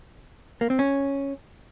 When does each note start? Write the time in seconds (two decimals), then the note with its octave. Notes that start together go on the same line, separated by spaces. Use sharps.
0.61 A#3
0.70 C4
0.79 C#4